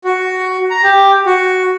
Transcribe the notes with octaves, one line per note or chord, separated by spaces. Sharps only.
F#4
A#5
G4
F#4